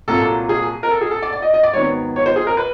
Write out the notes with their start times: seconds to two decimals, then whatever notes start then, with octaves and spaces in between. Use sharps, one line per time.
0.08 C2 A#2 F#3 A#3 A4
0.49 G#4
0.83 A#4
0.91 A4
1.01 G#4
1.11 A4
1.22 D5
1.33 D5
1.42 D#5
1.54 D#5
1.63 D5
1.74 G#2 D#3 F#3 B3 C#5
2.16 C#5
2.26 C5
2.36 G#4
2.47 A#4
2.57 B4